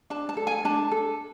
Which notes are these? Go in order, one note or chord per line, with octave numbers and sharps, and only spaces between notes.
D4 A5
A5
A4
G#5
D4 A5
A4